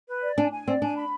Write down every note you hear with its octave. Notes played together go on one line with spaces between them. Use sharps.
B4
D5
D4 G#5
G#5
C4 D5
D4 G#5
B5